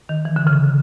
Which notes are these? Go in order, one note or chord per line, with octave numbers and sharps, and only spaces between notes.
D#3
E3
D3
C#3